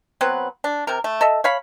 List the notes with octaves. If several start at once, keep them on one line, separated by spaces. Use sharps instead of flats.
F#3 B3 C4 B4
D4
C3 A#4
A3
A4 D#5 E5
C#5 F5 B5